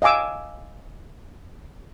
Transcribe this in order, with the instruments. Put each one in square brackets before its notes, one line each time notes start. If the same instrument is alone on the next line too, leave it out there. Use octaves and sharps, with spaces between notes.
[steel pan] D#5 F5 G#5 D6 E6